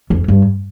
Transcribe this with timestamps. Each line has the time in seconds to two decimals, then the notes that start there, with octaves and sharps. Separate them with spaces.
0.10 F2
0.28 G2